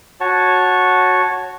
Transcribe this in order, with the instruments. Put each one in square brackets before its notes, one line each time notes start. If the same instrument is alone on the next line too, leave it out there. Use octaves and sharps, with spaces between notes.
[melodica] F#4 C#5 A5